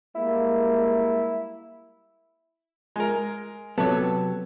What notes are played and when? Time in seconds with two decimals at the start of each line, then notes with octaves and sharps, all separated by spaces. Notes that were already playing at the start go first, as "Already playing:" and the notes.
0.15 G3 G#3 A#3 E4
2.96 G#3 A#4
3.78 C3 F#3 B3 A4 C#5